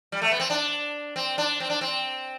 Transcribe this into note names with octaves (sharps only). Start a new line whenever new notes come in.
G3
A3
B3
C4
D4
C4
D4
C4
D4
C4